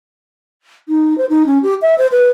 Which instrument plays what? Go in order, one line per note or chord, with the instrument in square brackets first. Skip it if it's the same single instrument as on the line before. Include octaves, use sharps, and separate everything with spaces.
[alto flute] D#4
C5
D#4
C#4
G4
E5
C5
B4